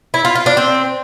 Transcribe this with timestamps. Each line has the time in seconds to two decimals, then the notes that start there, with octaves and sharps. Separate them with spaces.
0.14 E4
0.25 F4
0.35 F4
0.46 D4
0.57 C4